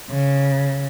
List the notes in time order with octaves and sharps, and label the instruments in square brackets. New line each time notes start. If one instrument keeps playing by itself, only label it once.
[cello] C#3